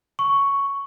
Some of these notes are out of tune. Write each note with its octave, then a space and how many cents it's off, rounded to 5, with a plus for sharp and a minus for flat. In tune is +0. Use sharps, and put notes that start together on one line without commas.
C#6 +5